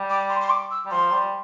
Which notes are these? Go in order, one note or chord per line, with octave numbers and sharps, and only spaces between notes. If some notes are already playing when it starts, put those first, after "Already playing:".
Already playing: G3
D6
C6
C6
D6
E6
G3
F3 C6
G3